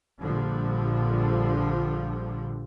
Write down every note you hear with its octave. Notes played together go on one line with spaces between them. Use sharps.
A#1 D3 F3 G3